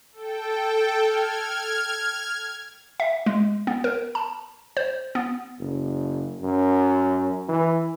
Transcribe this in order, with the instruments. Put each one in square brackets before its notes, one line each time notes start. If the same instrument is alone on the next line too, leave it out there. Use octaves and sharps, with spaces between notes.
[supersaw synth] A4 G5
F6 G#6
[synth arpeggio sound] E5
G#3
B3
A#4
A5
C5
B3
[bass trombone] F#1
F#2
E3